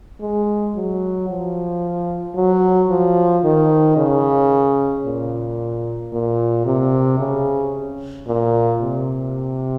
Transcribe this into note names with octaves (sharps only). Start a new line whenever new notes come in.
G#3
F#3
F3
F#3
F3
D#3
C#3
A#2
A#2
C3
C#3
A#2
C3